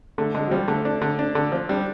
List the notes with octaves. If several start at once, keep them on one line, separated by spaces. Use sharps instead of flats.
D3 A3
D3 G#3
F#3
F3 G3
D3 A3
D4
D3
D4
D3
F3
G3 D4